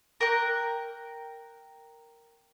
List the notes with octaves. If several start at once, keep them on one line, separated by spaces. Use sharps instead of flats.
A#4 G5 F#6